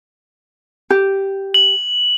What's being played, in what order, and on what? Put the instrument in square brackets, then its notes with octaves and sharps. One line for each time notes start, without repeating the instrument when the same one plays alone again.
[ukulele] G4
[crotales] F#7